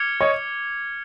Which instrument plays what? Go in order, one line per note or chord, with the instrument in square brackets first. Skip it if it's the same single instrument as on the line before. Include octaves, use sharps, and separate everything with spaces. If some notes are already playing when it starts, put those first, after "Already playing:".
Already playing: [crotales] D6 F6 G#6 C#7 F7
[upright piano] C#5 D#5